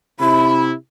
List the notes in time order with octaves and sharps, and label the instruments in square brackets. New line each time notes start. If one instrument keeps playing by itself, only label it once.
[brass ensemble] C3 E4 [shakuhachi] B5